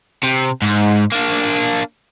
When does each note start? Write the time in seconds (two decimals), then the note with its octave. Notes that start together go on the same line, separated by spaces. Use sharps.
0.23 C3
0.62 G#2
1.12 A#3 D4